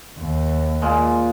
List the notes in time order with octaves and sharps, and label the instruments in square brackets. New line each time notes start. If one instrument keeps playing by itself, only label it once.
[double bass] D#2
[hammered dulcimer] A#2 G#3